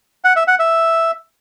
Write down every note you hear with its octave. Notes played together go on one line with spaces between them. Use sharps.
F#5
E5
F#5
E5